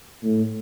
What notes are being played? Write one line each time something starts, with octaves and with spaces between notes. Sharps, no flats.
A2